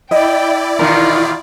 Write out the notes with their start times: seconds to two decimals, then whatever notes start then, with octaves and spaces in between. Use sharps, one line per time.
0.11 E4 D5 D#5 G5
0.79 E2 B2 D#3 D#4 F4 A#4